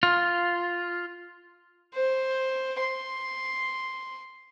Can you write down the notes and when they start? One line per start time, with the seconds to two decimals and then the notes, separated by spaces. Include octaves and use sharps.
0.03 F4
1.94 C5
2.81 C6